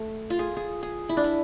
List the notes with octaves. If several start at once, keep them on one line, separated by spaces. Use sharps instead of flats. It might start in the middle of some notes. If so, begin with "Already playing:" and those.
Already playing: A3
F4
G#4
G#4
G#4
E4
D4
E4